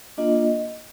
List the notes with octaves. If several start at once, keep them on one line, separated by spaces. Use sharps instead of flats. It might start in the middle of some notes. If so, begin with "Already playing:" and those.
A#3 D4 F4 D#5